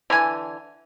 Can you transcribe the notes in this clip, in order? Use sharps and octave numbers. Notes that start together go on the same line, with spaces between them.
D3 E3 G#5